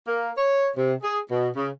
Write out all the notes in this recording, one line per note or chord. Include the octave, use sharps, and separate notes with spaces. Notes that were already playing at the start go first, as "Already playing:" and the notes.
A#3
C#5
C3
G#4
B2
C#3